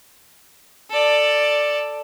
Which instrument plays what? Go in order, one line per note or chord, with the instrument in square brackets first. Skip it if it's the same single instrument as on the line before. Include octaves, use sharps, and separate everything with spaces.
[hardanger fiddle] A4 D5